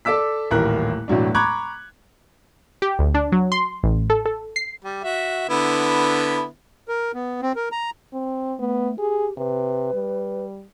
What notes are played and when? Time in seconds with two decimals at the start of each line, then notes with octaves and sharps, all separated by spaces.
0.05 A4 D5 D6 E6 B6
0.51 D#1 A1 A2 A#4 F#6
1.08 E1 A2 F#3 D4
1.35 A#5 B5 C#6 D6 F#6 G#6
2.82 G4
2.99 D2
3.15 D4
3.32 F#3
3.52 C6
3.83 A1
4.10 A4
4.26 A4
4.56 C7
4.84 G3
5.04 F#4 E5
5.49 D3 B3 E4
6.88 A#4
7.14 B3
7.42 C4
7.56 A#4
7.72 A#5
8.13 C4
8.59 A3 B3
8.99 G4 G#4
9.37 C3 B4
9.93 G3